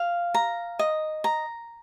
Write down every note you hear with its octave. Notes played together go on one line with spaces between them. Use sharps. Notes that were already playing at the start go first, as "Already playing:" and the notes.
Already playing: F5
A#5
D#5
A#5